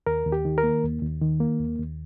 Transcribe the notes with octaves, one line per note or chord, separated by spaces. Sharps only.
D#2 A#4
D#2
G4
D#3
A#4
A#3
D#2
D#2
D#3
A#3
D#2
D#2